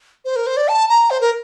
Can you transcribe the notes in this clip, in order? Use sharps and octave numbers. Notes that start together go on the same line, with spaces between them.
C5
A#4
C5
D5
A5
A#5
C5
A#4